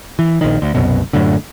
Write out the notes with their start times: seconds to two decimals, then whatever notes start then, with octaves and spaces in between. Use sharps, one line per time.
0.19 E3
0.41 A#1 D#3
0.62 D2
0.75 C2 F#2 B2
1.13 F#2 A2 D3